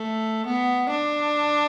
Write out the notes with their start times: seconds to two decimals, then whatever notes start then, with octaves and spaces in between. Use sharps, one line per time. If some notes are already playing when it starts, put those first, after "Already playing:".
Already playing: A3
0.47 B3
0.90 D4